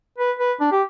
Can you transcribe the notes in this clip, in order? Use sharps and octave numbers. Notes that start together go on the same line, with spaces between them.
B4
B4
D4
G4